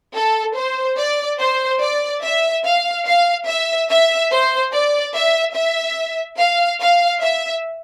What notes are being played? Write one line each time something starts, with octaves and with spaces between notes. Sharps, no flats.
A4
C5
D5
C5
D5
E5
F5
F5
E5
E5
C5
D5
E5
E5
F5
F5
E5